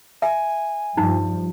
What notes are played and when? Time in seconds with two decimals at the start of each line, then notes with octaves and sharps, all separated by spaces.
0.22 E5 G#5
0.97 G2 F3 D#4